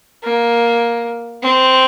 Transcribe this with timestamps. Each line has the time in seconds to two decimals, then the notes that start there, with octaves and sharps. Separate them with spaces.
0.23 A#3
1.43 C4